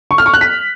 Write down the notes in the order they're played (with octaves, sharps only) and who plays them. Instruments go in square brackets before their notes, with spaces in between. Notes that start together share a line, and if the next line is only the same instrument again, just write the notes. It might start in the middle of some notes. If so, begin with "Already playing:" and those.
[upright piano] C#6
F6
C#6
F#6
B6